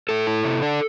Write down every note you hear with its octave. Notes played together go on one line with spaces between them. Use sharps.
A2 A4
E4
C3
D4